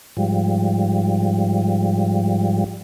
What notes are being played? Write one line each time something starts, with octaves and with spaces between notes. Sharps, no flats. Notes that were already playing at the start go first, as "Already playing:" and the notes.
G#2 F3 G3